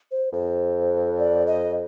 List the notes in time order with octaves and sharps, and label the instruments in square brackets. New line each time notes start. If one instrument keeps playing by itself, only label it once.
[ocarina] C5
[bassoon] F2 [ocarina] C5
[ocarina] D5
D#5